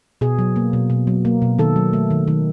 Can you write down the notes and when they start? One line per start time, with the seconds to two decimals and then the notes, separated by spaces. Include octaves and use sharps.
0.21 B2 G#4
0.39 F#3
0.56 A#3
0.73 B2
0.90 B2
1.07 F#3
1.25 A#3
1.42 B2
1.59 D#3 A4
1.76 F#3
1.93 A3
2.10 D#3
2.28 D#3